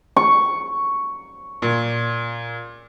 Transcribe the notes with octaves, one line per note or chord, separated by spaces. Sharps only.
C#6
A#2